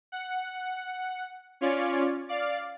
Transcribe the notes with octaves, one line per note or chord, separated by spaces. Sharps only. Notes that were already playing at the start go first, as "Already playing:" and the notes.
F#5
C#4 F4 C#5 D5
D5 F5